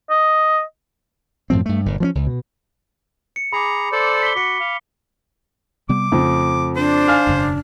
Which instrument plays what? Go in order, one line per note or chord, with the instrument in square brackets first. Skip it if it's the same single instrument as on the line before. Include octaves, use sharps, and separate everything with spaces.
[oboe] D#5
[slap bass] F#2 A2 F3 C4
G2 A3
G1 A#2
F3 A#3 C#4
C#2
B2
[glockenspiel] C#7
[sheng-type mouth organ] G#4 A#5 [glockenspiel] B5 D6
[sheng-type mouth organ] A4 C5 D5
[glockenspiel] B6 G7
[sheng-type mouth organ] F#4 [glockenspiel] D6 B6 C#7
[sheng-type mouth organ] F5
[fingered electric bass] C3 G3 B3 [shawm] D6
[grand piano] F2 [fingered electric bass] C#3 A3
[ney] D4 [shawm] C5
[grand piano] F5 G#5 F6
[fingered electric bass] E1 F#2 C#3